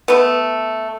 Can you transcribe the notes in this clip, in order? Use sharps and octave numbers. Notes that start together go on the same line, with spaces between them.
A3 B3